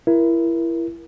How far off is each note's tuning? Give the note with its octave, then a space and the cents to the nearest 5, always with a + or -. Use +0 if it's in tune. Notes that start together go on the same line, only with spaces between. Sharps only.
E4 +20 A#4 +25